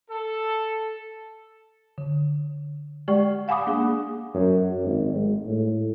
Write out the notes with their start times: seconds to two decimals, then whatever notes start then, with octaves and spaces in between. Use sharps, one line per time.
0.10 A4
1.98 D3
3.08 G#3 G4 D5 G5 C#6
3.48 F5 F#5 G#5 B5 D6 D#6
3.67 A#3 D4 G#4
4.34 F#2
4.84 G#1
5.15 G#3
5.45 A2